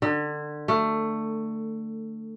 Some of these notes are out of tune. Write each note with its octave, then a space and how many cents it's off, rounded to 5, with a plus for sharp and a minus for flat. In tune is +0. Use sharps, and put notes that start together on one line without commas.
D3 +25
A3 +15